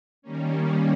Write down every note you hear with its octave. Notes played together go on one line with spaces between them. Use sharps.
D#3 G3 A#3 C#4